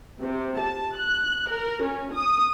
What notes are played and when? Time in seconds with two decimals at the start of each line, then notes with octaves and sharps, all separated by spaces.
0.21 C3
0.59 A5
0.97 F#6
1.49 A#4
1.83 C#4
2.14 D#6